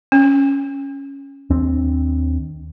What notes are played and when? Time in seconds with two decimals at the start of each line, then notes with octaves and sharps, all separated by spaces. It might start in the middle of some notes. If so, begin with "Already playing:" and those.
0.12 C#4
1.50 D#2 C4 D4